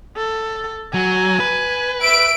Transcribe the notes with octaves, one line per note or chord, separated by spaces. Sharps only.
A4
F#3 G#5
B4
E5 D7